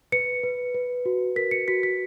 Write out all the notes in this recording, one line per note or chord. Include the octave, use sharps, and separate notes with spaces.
B4 C#7
B4
B4
F#4
A#4 B6
C#7
F#4 B6
B6